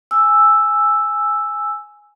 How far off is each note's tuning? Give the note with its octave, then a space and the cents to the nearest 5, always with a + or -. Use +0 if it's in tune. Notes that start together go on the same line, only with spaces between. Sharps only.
G#5 +0 E6 +0